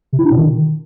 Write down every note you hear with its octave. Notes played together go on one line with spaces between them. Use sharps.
C3
E4
D4
B2
D#3